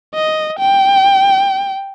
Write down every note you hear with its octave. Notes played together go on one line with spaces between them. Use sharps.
D#5
G5